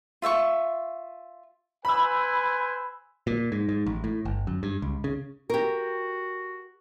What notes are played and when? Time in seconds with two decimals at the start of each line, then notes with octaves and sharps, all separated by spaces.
0.22 F4 E5 G5 C#6
1.85 B4 C5 G#5 B5 E6
3.27 A#2
3.52 G#2
3.69 G#2
3.86 A1
4.04 A2
4.25 G1
4.47 F#2
4.63 G2
4.82 C#2
5.04 C#3
5.50 F#4 G4 A#4